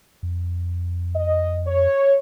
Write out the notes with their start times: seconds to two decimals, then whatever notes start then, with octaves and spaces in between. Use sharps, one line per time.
0.23 F2
1.16 D#5
1.67 C#5